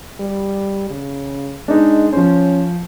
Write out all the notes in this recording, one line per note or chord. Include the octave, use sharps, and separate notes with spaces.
G3
C#3
G#3 D4 D#4
F3 C#4 C5